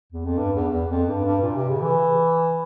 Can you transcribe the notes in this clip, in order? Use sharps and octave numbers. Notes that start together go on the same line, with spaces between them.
E2
F2
G2
E2
E2
F2
G2
G2
A#2
C3
C#3
E3